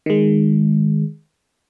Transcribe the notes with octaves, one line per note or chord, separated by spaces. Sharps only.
D#3 G#3